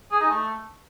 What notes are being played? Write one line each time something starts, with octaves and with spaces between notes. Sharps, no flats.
G#4
D#4
A3